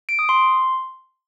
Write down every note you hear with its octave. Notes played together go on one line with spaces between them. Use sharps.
D7
D#6
C6